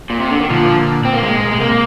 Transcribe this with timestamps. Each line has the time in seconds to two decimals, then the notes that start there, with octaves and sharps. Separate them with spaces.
0.10 A#2
0.20 C3
0.30 D3
0.41 D#3
0.50 A#2 D3 F3
1.05 C4
1.13 A#3
1.23 A#2 G#3
1.41 A#2
1.51 G#3
1.60 C3 A#3